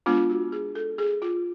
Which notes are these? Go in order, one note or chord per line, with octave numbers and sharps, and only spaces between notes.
G#3 B3 D4 F4
F#4
G#4
A4
G#4
F4